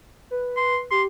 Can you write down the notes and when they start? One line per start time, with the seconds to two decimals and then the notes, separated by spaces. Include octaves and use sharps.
0.31 B4
0.57 C6
0.91 G4 C6